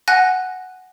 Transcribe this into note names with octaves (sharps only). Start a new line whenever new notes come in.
F#5 G#5 F#6 A#6